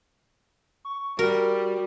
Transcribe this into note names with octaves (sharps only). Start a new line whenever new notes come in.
C#6
G3 F#4 A#4